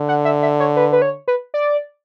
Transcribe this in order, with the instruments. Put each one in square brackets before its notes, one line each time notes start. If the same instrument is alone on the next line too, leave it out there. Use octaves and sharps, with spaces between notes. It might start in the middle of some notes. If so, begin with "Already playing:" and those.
Already playing: [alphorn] D3
[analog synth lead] F#5
E5
E5
C#5
B4
B4
C#5
B4
D5